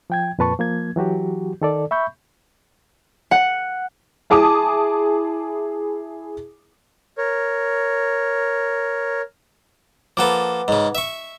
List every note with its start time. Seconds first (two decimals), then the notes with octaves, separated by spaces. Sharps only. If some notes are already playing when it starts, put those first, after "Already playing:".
0.10 F3 G5 G#6
0.39 F2 A#2 B4 A5 C#6
0.59 F3 A#3 G#6
0.96 E3 F#3 F#4 G4
1.62 D#3 A4 D5
1.91 E5 B5 C#6 G6
3.31 F#5
4.30 E4 G#4 A5 D6 D#6
7.18 A#4 C#5
10.17 F3 A#3 A4 B4 F#5 D6
10.68 G#2 C#3
10.95 E5 C#6